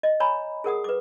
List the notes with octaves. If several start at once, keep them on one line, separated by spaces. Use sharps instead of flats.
D#5
C#5 G#5 A#5 B5
G#4 A#4 F#5 D#6
B4 D6